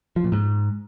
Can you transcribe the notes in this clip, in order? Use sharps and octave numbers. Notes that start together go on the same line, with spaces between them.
F3
A#2
G#2